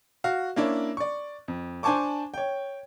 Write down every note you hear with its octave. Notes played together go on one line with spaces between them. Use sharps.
F#4 F5
A#3 C#4 D4 E4 C#5
D5 C#6
F2
D4 C5 G#5 A5 C#6 D6
C#5 G5